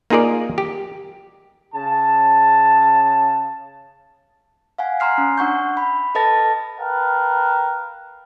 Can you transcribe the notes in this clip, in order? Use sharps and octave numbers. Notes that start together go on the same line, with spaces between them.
A#3 D#4 F4 G#4 A#4 D5
G4
C#3 A5
F5 F#5 G#5
G#5 A#5 C6 F6 C7
C#4
D4 F#5 C#6 G6
B5
A4 B4 D#5 A5 A6 A#6
A#4 B4 F5 G5 A5